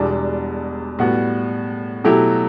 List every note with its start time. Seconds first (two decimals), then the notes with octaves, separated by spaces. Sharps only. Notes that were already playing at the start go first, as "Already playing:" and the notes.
Already playing: E1 E2 B2 G3 D4
0.99 A2 G3 B3 F#4
2.04 B2 F#3 A3 E4 G4